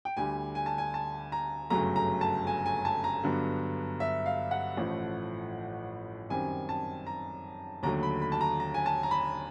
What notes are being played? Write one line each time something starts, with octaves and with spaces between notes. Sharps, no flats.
G5
D2 D3 G3 G#5
G#5
A5
G#5
A5
A#5
G1 F#2 C#3 F#3 A3 A#5
A#5
A5
G#5
G#5
A5
A#5
G2 D3 F#3 B3
E5
F5
F#5
A1 A2 F3 A3
F#2 D#3 G3 C4 G#5
A5
A#5
D#2 D3 F#3 A3 A#5
B5
B5
A5
A#5
A#5
G#5
A5
A#5
B5